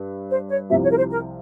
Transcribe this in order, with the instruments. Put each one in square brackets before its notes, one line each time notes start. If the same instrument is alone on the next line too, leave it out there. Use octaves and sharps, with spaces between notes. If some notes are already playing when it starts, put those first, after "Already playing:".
Already playing: [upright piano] G2
[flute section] C5
C#5
[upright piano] C2 C3 F3 [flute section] E5
[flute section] C#5
A#4
C5
A#4